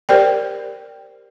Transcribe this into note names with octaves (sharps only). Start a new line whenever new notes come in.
G4 A#4 C5 D5 G5